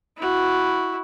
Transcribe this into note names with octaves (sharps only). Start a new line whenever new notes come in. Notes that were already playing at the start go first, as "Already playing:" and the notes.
E4 F#4